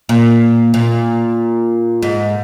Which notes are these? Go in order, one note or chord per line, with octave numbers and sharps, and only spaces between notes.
A#2
A#2
G#2